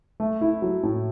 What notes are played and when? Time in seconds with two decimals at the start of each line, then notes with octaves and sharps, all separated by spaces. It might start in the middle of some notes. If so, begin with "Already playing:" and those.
0.20 A3
0.41 E4
0.62 F#3
0.83 A2